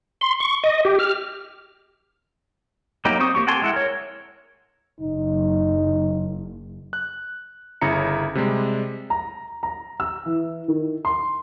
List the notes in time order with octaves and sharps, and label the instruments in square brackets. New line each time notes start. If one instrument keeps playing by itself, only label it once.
[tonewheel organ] C6
C#6
D#5
G4
F6
[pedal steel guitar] F#3 A#3 D#4 G4
C4 C5 C#6 D#6
A#3 C4 G4 C#6
F#4 G4 A4 G#5 C6
G#3 E4 F#5
A#4 C#5
[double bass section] F#1 [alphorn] D#4
[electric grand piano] F#6
G1 C#3 E4 A#5 C#7
C3 G3 G#3
[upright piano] A#5
A#5
E6
E3
D#3
C6